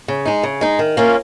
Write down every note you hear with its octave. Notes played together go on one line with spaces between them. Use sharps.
C#3
G#3 D#4
C#3
G#3 D#4
D#3
A#3 C#4 F4